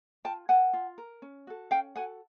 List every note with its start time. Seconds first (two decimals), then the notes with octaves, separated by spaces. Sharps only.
0.24 F4 G5 A5
0.49 A#4 F#5 G#5
0.73 F4
0.98 A#4
1.22 C#4
1.47 F#4 A4
1.71 C#4 F5 G5
1.96 F#4 A4 F#5 G#5